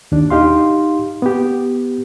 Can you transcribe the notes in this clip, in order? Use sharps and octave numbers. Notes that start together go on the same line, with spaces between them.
D#2 D4
D#4 G4 F5 C6
B3 G4